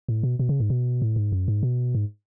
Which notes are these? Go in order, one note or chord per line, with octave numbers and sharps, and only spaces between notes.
A2
B2
B2
C#3
G#2
B2
A2
G#2
F#2
G#2
B2
G#2